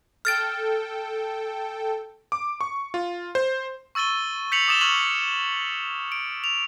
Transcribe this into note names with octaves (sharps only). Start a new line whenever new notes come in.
A4 G5 F6 A6 D7
D6
C#6
F4
C5
C#6 E6 A6 D#7 G7
G6 B6 C#7 F7 F#7
D6 D#6 A6 E7 F7 G7
C#6 F6 G#6 B6 F#7
D7
F7